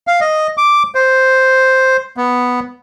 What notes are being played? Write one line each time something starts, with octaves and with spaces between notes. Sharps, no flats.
F5
D#5
D6
C5
B3